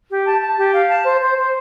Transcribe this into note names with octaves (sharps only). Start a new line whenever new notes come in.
G4
A5
A5
G4
F5
A5
C5
C5
C5